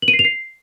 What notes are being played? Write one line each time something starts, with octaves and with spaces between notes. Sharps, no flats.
F#7
D#7
C7
F7
C7